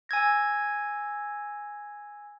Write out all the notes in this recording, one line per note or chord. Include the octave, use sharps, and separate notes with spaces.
G#5 E6 G#6 A#6